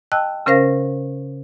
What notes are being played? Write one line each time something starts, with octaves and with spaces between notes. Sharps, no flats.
D#5 G5 A5 E6 F#6
C#3 C#4 A#4 C5 F5 A#6